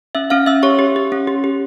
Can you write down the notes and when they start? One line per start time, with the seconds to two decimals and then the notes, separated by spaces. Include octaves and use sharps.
0.15 C#4 E5 E6
0.30 C#4 F5 F6
0.46 C#4 E5 E6
0.63 G4 C#5 C#6
0.79 G4
0.96 G4
1.12 C#4
1.27 G4
1.44 G4